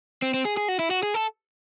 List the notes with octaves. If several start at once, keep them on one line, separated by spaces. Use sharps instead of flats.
C4
C4
G#4
G#4
F#4
E4
F#4
G#4
A4